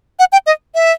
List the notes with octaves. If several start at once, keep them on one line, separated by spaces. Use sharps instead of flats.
F#5
G5
D#5
E5